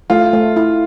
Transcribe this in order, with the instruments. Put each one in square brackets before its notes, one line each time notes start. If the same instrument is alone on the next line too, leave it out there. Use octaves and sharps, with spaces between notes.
[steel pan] A3 [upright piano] F4
[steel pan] A3
E4